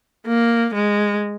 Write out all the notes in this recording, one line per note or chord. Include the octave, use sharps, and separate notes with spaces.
A#3
G#3